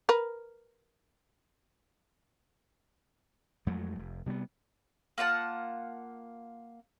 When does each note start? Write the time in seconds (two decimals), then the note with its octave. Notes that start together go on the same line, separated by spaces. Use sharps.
0.09 A#4 B4
3.66 F2 F#3 G#3 A3
3.99 F1
4.26 C3 G3 A#3 B3
5.18 A#3 F4 F#5 A5